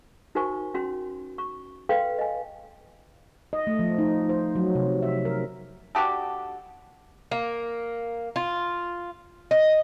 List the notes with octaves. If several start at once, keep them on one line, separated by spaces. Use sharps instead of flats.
D#4 F#4 A#4 C5 G#5 C#6
C#4 F#4 C6
C#6
A4 B4 F5 G5 C6
D#5 G#5
D#5
A3
F3
D#4
C5
F#3
C3
E5
A#4
D4 F#4 G4 A4
A#3
F4
D#5